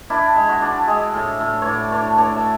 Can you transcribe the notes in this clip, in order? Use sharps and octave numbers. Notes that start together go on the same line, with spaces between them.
D4 E4
G#3
F#4
D4
G#3 G#4
A2
A2
A2 C#5 D5
D4 C#5
D4 C#5
E5